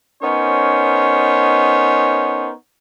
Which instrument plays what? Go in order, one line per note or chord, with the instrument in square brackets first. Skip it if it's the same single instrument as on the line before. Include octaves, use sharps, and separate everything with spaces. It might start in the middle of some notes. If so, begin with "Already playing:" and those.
[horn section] B3 C#4 D#4 A#4 C5 C#5